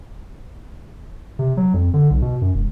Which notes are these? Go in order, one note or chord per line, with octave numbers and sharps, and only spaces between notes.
C3
F#3
F2
D3
B1
B2
F#2
E1